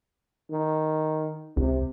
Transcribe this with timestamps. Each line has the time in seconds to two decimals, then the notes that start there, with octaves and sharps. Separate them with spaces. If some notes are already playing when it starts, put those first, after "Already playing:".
0.51 D#3
1.57 C#2 C3